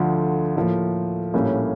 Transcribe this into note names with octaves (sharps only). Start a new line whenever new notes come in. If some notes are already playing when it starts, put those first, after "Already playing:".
Already playing: D2 D3 F3
A2 F3 A#3
A#1 A2 G3 A#3 C#4